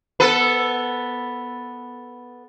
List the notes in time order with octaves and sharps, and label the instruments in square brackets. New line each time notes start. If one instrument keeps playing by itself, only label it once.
[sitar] B3 A4 B4